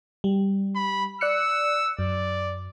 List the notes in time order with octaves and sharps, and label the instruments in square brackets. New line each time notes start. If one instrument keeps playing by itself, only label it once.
[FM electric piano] G3
[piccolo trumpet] B5
[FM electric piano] D5 F#6 C#7 [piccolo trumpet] E6
[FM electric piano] F#2 [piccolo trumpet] D5